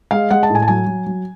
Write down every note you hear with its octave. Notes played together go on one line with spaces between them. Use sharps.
G#3 F5
G#3 F#5
A5
A2
G#5
A5
F#3 G#5
F#3
F#3